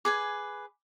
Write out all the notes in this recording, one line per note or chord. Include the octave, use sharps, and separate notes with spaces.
G#4 B4 G#5 D6